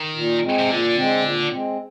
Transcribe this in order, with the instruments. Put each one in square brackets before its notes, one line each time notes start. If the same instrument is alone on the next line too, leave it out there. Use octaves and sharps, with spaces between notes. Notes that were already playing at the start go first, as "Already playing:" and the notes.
Already playing: [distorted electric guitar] D#3
[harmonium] A#2
G#3 C4
[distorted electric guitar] C3
[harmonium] A#2 [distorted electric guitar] D3
[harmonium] G#3 C4
A#2
G#3 C4